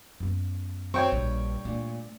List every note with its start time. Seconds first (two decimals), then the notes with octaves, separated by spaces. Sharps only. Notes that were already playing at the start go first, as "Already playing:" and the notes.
0.20 F#2 B3
0.94 C4 C#5 G5 C#6
1.12 A#1 G2
1.65 A#2 A3 D4